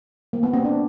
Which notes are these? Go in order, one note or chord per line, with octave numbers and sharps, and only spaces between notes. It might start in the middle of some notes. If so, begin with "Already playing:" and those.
A#3
B3
C4
D4